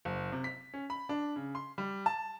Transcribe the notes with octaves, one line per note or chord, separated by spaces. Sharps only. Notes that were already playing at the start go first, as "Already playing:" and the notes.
F#1
C3
B6
C#4
B5
D4
C#3
C6
G3
A5